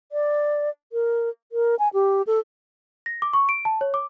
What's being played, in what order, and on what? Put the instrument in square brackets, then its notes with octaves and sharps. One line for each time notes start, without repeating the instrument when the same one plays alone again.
[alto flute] D5
A#4
A#4
G#5
G4
A4
[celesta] A#6
D6
C#6
D7
A5
C#5
D6